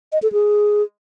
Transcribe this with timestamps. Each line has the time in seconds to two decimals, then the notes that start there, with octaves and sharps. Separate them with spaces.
0.12 D#5
0.22 A4
0.33 G#4